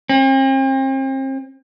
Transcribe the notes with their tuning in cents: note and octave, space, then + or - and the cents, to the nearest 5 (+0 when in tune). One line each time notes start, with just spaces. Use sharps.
C4 +40